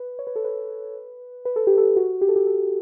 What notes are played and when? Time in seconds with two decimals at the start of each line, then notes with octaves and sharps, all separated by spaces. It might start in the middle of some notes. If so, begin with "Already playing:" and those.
Already playing: B4
0.19 C#5
0.27 B4
0.36 A4
0.45 B4
1.45 B4
1.56 A4
1.67 G4
1.78 A4
1.96 F#4
2.21 G4
2.29 A4
2.36 G4
2.47 A4